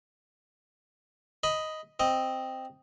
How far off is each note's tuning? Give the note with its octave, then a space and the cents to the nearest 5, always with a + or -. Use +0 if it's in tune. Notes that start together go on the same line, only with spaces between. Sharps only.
D#5 +5 B5 +0
C4 +0 D#5 +0